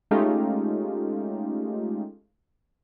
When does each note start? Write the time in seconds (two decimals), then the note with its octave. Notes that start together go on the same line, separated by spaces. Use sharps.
0.11 G#3 A3 C#4 D#4 F4 G4